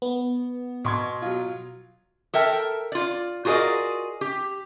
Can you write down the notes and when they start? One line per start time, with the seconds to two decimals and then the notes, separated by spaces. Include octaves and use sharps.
0.02 B3
0.85 B2 C6 G#6
1.22 F#3 F4
2.34 A4 A#4 E5 G5
2.92 F4 D5
3.45 F4 F#4 G#4 A#4 D5 D#5
4.21 G4